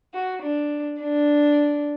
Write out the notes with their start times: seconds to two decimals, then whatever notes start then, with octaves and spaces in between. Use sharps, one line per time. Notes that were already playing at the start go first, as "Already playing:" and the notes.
0.13 F#4
0.42 D4
1.01 D4